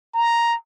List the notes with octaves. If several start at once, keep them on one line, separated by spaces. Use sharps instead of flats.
A#5